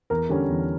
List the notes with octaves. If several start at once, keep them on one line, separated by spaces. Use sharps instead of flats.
E2 A#4
D3 G3 C#4
E2